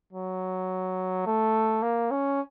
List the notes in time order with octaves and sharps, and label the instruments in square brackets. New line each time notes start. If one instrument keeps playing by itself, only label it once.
[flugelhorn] F#3
A3
A#3
C#4